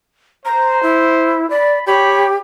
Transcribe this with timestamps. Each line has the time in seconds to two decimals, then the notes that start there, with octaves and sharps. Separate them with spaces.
0.45 C5 A#5
0.83 E4
1.50 D5 B5
1.87 G4 C#5 G5 B5